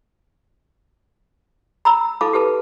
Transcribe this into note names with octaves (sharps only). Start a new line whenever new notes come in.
A#5 B5 E6
E4 A4 F5 A5 B5 D6
G4 A4 B4 A5